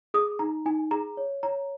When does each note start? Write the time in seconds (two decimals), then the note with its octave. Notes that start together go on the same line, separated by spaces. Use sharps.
0.14 G#4 D#6
0.39 D#4 A#5
0.66 D#4 G#5
0.91 G#4 A#5
1.17 C#5
1.43 C#5 A#5